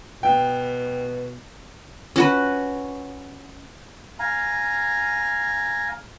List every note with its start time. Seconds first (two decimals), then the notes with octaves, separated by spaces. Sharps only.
0.23 B2 G5
2.16 C#4 F#4 B4
4.19 F5 G#5 A#5